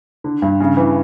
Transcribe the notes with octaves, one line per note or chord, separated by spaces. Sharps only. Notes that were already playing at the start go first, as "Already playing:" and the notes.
D3
G2
C#3
E3